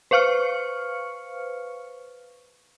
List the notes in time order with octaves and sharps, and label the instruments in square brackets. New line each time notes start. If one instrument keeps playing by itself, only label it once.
[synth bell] B4 C5 F5 C#6 F6 C#7